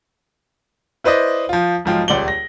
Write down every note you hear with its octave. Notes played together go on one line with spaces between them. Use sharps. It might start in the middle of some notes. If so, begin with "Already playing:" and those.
E4 B4 C5 D5 D#5
F3 F4
B1 G#2 F3 F4 G5
D#1 C#2 D5 F#7 G7
A#6